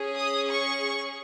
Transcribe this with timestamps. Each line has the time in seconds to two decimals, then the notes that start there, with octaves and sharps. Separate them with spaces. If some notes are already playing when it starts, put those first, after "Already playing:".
Already playing: C#4 G#4
0.16 D#6
0.49 C#6